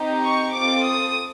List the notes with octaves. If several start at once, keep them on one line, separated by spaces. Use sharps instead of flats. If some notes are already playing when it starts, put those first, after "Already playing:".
Already playing: C4 D#4 G4
C#6
C4 F4 A4 D6
D#6